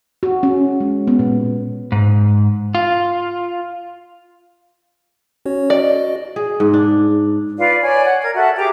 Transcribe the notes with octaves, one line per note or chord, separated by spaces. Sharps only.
F#4
C#4
G#3
B3
A#2
G#2
F4
C#4 F#4 C#5
F#4 D5 D#5
G#4
G#2
D4
F4 B4 D5 F5
C#5 D5 G#5
C#5 F#5
A#4 G#6
F#4 A4 E5 F#5
G4 G#4 A#5 D6